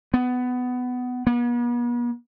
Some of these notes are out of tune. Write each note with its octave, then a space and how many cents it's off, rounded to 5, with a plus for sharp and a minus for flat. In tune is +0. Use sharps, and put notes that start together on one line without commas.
B3 +15
B3 -45